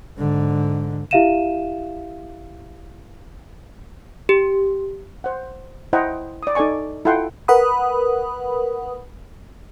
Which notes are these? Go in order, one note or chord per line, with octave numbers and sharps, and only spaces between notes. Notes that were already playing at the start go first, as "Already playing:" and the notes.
G#2 D3
E4 G4 E5 F5 D#7 E7
G4
C5 F#5
E4 C5 D#5 F#5 G5 A#5
D5 D#6
D#4 A4 D5 G#5 C#6
E4 F4 A4 F#5 G5 C6
A#4 B4 F#5 B5 D#6